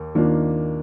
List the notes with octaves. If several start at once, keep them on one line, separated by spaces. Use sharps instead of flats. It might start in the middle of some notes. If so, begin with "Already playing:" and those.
Already playing: D#2 A#3
D#2 D#3 A#3 D4 F4